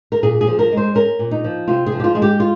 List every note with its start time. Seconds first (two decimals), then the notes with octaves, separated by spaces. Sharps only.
0.12 A#4
0.23 A#2 G#4
0.41 G#4
0.47 F3
0.59 A#4
0.71 G#3
0.77 C5
0.95 C#4 A#4
1.19 A#2
1.31 D#4
1.44 F3
1.68 C3 F4
1.86 G#4
1.92 F3
2.00 G4
2.04 F4
2.15 G#3 G#4
2.22 G4
2.40 F4